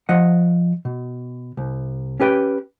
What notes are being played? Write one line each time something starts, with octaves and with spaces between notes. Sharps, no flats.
F3 D#5 F#5
B2
C2
C#4 G4 B4 G5